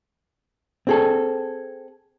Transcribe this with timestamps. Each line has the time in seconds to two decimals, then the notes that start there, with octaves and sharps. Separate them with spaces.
0.87 C4 G#4 A4